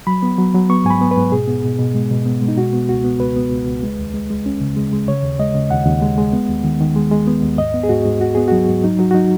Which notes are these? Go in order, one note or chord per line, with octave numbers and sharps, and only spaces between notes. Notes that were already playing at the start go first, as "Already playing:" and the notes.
F#3 B5
B3
F#3
F#3
B3 C#6
G#2 G#5
B5
B3
B4
G#2
B2 G#4
B3
B2
B2
G#3
B2
B3
G#3
D#4
B2 F#4
B3
C#2 F#4
B3
C#2 B4
B3
C#2
C#2
G#3
D#2
G#3
G#3
C#4
C#3
G#3
G#3
C#3 C#5
D#2
G#3 D#5
C#3
D#2 F#5
D#2
G#3
G#3
B3
D#2
D#3
D#3
G#3
G#3
B3
D#2
G#2 D#5
B3
G#4
G#2 F#4
G#2
G#2 F#4
B3 G#4
F#3 F#4
G#2
F#3 D#4
F#3 F#4
F#4
F#3 D#4